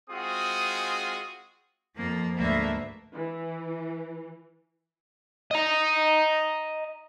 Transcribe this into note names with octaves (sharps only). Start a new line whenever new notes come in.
G#3 C4 F4 F#4 G#4 D#6
F2 F3 A#3
D2 G#2 A#3 B4 E5
E3
D#5 A#5